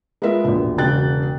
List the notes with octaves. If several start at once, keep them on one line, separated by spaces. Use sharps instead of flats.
G#3 B3 F4 A#4 E5
E1 A#1
E1 C#3 F#4 G5 F#6 A6